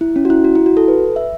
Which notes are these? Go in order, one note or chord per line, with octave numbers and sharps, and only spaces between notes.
E4
C#4
F#4
E4
F#4
E4
F#4
A4
B4
E5